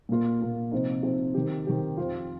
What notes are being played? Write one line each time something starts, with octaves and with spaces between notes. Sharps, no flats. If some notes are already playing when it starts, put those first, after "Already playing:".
A#2 A#3 F4
A#2 A#3 F4
C3 F3 C4 D#4
C3 F3 C4 D#4
D#3 C4 G4
D#3 C4 G4
F2 F3 C4 F4